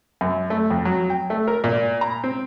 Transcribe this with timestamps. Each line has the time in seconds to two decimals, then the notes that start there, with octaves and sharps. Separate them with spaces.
0.21 F#2
0.50 A3
0.70 F2
0.85 F#3
1.10 G5
1.30 A3
1.48 A#4
1.64 A#2
2.01 A#5
2.24 C4